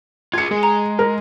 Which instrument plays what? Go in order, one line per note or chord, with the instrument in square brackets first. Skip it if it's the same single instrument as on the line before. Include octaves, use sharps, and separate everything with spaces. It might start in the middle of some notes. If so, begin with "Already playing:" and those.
[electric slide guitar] F4 G#4 [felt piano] G#6 C#7
[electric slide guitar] G#3 [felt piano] G#4
[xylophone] A#5
[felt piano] A#4